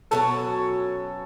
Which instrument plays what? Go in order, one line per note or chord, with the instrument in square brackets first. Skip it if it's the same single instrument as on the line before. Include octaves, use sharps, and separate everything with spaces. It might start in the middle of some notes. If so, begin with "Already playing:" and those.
[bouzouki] B2 F#3 A#3 C#4 [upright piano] A4 A5